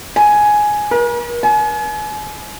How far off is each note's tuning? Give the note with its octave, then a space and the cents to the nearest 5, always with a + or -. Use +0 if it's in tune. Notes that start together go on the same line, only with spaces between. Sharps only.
G#5 +5
A#4 +45
G#5 +35